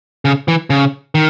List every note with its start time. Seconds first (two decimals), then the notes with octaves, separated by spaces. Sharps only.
0.25 C#3
0.48 E3
0.70 C#3
1.15 D#3